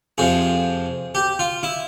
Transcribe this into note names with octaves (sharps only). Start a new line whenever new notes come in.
F2 C3 F3 G#4
G4
F4
E4